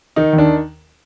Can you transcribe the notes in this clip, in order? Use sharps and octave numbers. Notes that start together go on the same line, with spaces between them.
D#3 D#4
D#2
D4